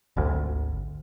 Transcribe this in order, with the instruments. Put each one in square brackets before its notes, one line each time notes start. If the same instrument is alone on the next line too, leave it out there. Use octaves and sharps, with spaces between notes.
[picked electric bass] G#1 D2